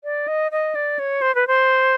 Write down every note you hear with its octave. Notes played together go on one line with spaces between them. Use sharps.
D5
D#5
D#5
D5
C#5
C5
B4
C5